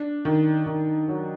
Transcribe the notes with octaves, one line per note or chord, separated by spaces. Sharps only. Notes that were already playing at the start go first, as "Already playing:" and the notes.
Already playing: D4
D#3
D#3
F#3